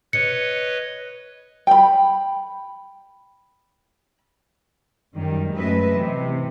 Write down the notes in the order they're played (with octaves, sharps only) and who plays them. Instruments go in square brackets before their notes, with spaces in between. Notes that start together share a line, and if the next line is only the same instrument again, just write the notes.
[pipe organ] B4 C#5 D#5 [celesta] C#7
[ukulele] G5 B5
[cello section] F#2 D#3 G3
F#2 G#3 A3 B4 D#5 E5
C3 E3